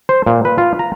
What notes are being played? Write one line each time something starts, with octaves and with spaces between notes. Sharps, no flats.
C5
A#2
B4
F4
A#5